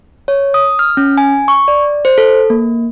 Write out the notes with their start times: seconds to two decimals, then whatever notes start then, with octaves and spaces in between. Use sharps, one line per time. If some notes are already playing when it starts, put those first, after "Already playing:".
0.28 C#5
0.54 D#6
0.79 F6
0.97 C#4
1.18 G#5
1.48 C#6
1.68 D5
2.05 C5
2.18 A4
2.50 A#3